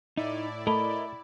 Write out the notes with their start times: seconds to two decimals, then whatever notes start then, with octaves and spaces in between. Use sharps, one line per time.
0.17 A2 D#4 E4 D5
0.67 A3 A#4 D#5 B5